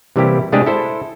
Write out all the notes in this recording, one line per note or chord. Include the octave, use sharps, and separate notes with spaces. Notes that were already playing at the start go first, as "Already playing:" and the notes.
C3 E3 G3 A#3 E4 G4
C3 G#3 A3 D4 G4 G#4
E4 A4 C5